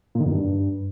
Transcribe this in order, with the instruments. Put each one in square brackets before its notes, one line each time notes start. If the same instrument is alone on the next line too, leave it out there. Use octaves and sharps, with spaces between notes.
[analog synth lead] A#2
D#3
F#2
G2